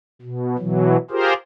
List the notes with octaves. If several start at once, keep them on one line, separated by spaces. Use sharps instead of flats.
B2
B2 E3 F#3
F4 G4 G#4 A#4 C5